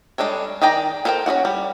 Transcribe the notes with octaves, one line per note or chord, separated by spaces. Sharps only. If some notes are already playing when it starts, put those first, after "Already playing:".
G3 G#3 D4 A4 C#5
D#3 G#4 D5 G5 A#5
A4 A#4 C5 F#5 G5
C#4 D#4 F#4 F#5
G3